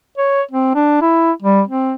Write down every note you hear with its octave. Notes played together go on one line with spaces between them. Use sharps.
C#5
C4
D4
E4
G3
C4